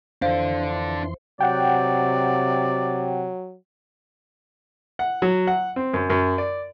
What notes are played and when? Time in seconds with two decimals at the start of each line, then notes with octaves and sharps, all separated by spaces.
0.22 F2 E3 D4 A4 C5 F5 C6
1.40 C3 F#3 D5 F#5 G5
4.99 F#5
5.22 F#3
5.47 F#5
5.76 C4
5.94 F#2
6.10 F#2
6.38 D5